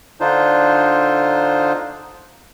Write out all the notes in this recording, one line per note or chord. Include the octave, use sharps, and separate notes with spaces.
D3 D4 D#4 F4 C5